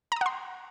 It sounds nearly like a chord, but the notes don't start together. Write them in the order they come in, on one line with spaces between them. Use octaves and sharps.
A#5 D#6 F#5 C6